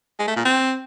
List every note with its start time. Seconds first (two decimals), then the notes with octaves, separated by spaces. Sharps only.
0.19 G#3
0.27 A3
0.36 A#2
0.45 C4